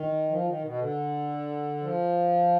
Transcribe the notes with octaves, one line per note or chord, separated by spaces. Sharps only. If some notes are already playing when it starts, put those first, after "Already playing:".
Already playing: D#3
F3
D#3
B2
D3
F3